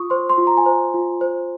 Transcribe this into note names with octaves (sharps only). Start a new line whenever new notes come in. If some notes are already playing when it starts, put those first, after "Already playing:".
Already playing: F4 C#6 D#6
C5 C6
C6
F4
A#5
G#5
C5 A#5
F4
C5